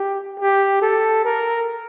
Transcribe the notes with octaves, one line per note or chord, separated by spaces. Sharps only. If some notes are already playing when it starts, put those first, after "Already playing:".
Already playing: G4
G4
A4
A#4